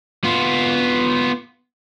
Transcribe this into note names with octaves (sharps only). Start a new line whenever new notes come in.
B3 F4